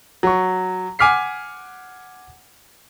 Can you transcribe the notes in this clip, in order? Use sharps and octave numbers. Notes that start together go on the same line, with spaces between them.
F#3 C#6
F#5 G#5 D6 F6 B6 C7